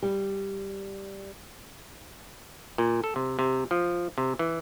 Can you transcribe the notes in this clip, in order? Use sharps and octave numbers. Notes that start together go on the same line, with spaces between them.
G3
A#2
A4
C3
C3
F3
C3
E3